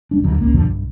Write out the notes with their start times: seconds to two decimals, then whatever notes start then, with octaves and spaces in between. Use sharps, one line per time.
0.11 D#1 G3 D4
0.24 D#2 D3 F#3
0.38 G#1 C#2 A#3 C#4
0.54 F2 B2 D3 F3
0.65 B1 G2